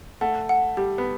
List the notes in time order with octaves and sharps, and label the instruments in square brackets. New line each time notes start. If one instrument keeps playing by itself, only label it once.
[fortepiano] A3 [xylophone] F#5
[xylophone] F#5
[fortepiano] G3 [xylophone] G4
[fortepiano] B3